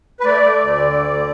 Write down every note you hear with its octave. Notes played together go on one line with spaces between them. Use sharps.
B4
A3 D5
A3
D2
D3
D2
D3